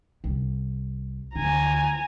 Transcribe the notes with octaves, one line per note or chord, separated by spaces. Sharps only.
C2
D2 G#5 A#5